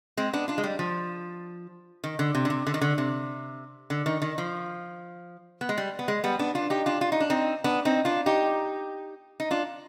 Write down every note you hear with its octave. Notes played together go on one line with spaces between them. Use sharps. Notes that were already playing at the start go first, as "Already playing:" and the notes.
G#3 C4
B3 D4
D4 F4
G#3
G3
F3
D#3
D3
C3
D3
C3
D3
D#3
D3
C3
D3
D#3
D#3
F3
B3
G#3
G3
B3
G#3
G3 B3
B3 D4
D4 F4
D#4 G4
D4 F4
F4
D#4
D4
C4 D#4
B3 D4
C4 D#4
D4 F4
D#4 G4
D#4
D4 F4